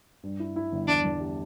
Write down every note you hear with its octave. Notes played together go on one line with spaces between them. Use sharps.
G2
E4
E4
G1
E2 D4
E2
G3